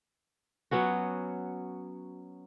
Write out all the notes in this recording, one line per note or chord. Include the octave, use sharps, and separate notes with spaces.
F#3 B3 C#4 F#4